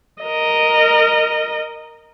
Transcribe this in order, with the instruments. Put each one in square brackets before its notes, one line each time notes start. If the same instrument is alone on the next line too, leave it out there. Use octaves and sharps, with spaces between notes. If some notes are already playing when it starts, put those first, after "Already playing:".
[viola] A#4 D#5